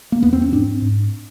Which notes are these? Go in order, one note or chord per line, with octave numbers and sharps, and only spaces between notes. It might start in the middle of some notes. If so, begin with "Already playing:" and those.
A#3
E2 B3
C4
C#4
G#2 C4 D4
G#2